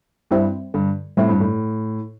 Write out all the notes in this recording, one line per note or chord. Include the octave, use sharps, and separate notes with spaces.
G2 G3 C4 E4
G2 D3
A2 G3 C4 E4
G2
A2